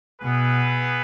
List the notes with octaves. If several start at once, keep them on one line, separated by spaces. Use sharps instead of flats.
B2 B3 E4 G#4 B4